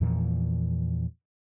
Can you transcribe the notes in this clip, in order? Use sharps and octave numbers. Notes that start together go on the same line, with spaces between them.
E2 A#2 E3 F3